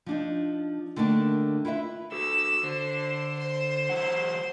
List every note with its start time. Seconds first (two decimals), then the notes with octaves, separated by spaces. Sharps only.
0.06 F3 D4 D#4
0.96 D3 D#3 A3 A#3 C4 D4
1.65 E4 F4 B4 E5
2.12 F#4 A4 E6
2.63 D3 C5
3.39 C5
3.89 E3 F#3 F#5